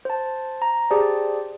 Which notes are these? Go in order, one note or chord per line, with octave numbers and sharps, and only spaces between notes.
C5 A5
A#5
G4 G#4 C5 D5 A5